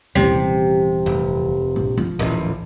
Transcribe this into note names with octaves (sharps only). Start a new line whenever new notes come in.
D#1 C3 E3
F1
A#1
F3
D#1 A1